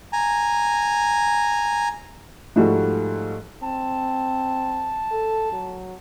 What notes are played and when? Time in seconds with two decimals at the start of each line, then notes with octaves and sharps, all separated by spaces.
0.13 G#5 A#5
2.56 G#2 F3 G3 A3 F#4
3.63 C4 A5
5.12 A4
5.53 F#3